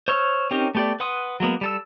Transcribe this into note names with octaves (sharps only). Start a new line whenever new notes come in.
C5 C#5 C#6 E6 F6
C4 C#4 D#4 G4 A#4
A3 B3 G4 A4 D5
B4 F#5 C6 D#6
F#3 G#3 A#3 B3
G3 A4 E6